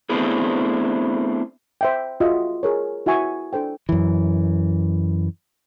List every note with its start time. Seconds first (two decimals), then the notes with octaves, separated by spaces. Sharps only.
0.10 A3 B3 C4 D4 E4 G#4
1.81 C5 E5 G5
2.20 F4 F#4 G#4 D#5 E5 F#5
2.63 G#4 A#4 C#5
3.06 E4 F#4 E5 G#5 C#6
3.53 D4 A4 C5 G5
3.89 F#2 E3